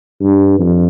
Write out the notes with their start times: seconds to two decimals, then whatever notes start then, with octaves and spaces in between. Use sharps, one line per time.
0.22 G2
0.59 F2